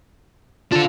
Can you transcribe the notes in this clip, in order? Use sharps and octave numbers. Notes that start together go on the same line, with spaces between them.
D4 F4 A4